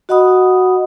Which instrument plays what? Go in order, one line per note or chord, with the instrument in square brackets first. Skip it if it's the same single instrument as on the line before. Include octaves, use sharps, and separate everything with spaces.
[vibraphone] F#4 D#5 F#5 B5 D#6